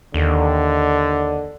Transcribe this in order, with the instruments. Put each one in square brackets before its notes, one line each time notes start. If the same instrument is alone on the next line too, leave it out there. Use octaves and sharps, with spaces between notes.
[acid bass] D#2 [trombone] D3